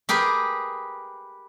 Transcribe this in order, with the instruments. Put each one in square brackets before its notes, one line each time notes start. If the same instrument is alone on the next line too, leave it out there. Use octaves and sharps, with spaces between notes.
[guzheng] G4 G#4 A#4 B4